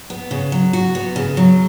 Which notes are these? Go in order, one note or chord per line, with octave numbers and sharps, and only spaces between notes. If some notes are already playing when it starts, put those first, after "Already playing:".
B3
C#3
F#3
F#4
B3
C#3
F#3